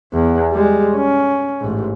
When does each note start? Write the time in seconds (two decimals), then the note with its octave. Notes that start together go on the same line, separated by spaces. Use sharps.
0.13 E2
0.52 G3 G#3
0.96 C#4
1.61 A1 G#2